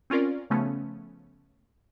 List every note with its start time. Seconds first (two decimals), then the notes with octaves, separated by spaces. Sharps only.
0.10 C4 C#4 F4 A#4 D5
0.50 C#3 F3 A3 B3 C#4